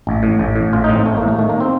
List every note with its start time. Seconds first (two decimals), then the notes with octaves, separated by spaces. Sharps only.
0.07 A1
0.23 A2
0.39 A1
0.56 A2
0.73 A1 F4
0.84 D#4
0.89 A2
0.95 C4
1.06 A1 A3
1.17 A#3
1.22 A2
1.28 A3
1.39 D#3 A3
1.49 A#3
1.60 C4